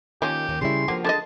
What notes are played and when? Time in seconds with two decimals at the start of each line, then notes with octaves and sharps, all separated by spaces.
0.22 D#3 F3 A#3 C#4 G4
0.49 D#2 D#3
0.61 C#3 G3 E4 C6
0.88 D3 F3 A#3 F#4 G4
1.04 D3 G#3 D#5 A5